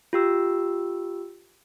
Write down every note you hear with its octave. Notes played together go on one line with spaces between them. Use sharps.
F4 G4 E6